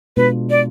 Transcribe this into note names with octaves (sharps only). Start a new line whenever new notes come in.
B2 G#3 B3 D4 F4 B4
D5